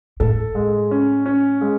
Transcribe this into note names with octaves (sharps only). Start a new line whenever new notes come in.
A2 A4
G#3
C#4
C#4
G#3